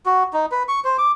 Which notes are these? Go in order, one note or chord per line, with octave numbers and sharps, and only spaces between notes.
F#4
D#4
B4
C#6
C5
D6